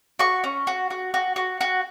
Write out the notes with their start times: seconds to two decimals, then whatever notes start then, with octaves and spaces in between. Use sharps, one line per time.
0.19 F#4 C#6
0.44 C#4
0.67 F#4
0.90 F#4
1.14 F#4
1.36 F#4
1.61 F#4